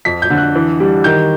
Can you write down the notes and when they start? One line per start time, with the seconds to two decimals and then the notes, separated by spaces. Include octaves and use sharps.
0.05 F2 B6
0.22 G6
0.30 D3
0.38 F#6
0.55 E3
0.80 G3
1.04 D#3 G6